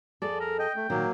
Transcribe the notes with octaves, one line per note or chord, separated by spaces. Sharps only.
F2 G#4 A4 D5
A#4
D#5 G5
A3
A#2 D#3 F#3 A#3